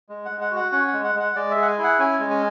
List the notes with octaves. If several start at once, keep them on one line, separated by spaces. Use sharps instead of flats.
G#3
F#5
G#3
F#5
F#4
F#5
C#4 F#5
F#5
G#3
F#5
G#3 F#5
G#3 D5
E5
G#4
F#5
G#5
E4
F#5
C#4 G#5
G#3
G#5